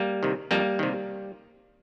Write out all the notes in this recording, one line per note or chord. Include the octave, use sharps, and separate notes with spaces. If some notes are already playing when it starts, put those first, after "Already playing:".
Already playing: G3 A#3
C3 D#3
F2 G3 A#3
C3 D#3